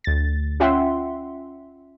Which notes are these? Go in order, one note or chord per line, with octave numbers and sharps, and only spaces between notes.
D2 A6
C#4 F4 E5 F#5 G5 C6